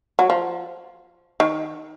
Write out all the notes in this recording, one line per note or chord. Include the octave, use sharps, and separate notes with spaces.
F#3
F3
D#3